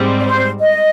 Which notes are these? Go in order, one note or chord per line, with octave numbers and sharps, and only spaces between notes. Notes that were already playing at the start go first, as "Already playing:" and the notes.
Already playing: G#2 G3 C4
D5
C5
D#5